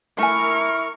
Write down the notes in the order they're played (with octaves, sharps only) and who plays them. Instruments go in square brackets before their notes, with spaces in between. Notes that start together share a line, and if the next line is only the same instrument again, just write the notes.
[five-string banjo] A3 G#5 [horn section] E4 A#4 [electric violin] C#6